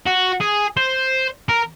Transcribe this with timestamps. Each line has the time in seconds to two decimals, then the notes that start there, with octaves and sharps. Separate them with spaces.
0.06 F#4
0.41 G#4
0.77 C5
1.49 A#4